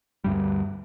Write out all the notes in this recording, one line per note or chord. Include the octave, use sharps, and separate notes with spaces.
D2 G2 G3